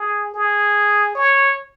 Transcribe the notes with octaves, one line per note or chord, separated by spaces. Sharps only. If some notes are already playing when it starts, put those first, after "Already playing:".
Already playing: G#4
G#4
C#5